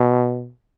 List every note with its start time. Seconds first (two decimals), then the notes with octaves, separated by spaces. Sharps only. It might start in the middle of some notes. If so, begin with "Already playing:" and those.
Already playing: B2